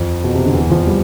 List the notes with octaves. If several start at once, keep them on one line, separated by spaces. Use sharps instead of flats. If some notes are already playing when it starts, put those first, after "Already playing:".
Already playing: F2 F3
B2
C3
D3
E2 E3
F2 F3
G3